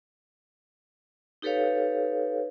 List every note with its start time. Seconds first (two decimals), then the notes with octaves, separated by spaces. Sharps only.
1.42 D#4 G4 A4 B4 C#5 F5